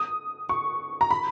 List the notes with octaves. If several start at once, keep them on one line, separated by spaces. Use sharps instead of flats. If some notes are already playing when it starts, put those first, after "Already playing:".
Already playing: D#6
C#6
A#5
B5